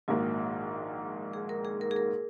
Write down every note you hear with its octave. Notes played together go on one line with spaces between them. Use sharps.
A#1 G#2 D#3 A#3 F#4
G#4
A#4
G#4
A#4
G#4
A#4